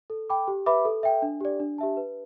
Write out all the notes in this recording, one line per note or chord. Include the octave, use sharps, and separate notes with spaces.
A4
G5 B5 D6
G4
B4 E5 B5 D6
A4
E5 G5
D4
G4 D5
D4
G4 E5 A5
B4